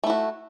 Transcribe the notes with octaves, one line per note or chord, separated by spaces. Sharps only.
A3 E4 F#4